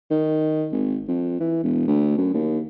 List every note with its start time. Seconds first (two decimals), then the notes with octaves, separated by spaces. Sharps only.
0.11 D#3
0.72 G#1
1.08 F2
1.40 E3
1.63 E1
1.88 D2
2.17 F#2
2.34 D#2